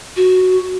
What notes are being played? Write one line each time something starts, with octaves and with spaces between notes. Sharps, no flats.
F#4